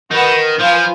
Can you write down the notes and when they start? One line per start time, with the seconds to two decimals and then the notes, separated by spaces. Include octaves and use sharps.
0.11 D#3 F#4 B4 F#5
0.59 F3 F4 B4 F5 G#5